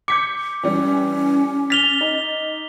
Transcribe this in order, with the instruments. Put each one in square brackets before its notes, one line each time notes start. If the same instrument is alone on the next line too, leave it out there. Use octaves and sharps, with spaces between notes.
[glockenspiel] D6 [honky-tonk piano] G6 B6 C#7
[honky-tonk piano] E3 G3 [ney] C#4
[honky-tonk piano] F6 A6 [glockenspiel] B6 F7 G7
[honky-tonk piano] D#4